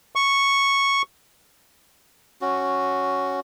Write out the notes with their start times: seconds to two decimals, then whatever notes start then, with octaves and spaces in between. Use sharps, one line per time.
0.15 C#6
2.41 C#4 F#4